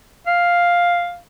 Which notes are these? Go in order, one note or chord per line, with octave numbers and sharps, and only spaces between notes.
F5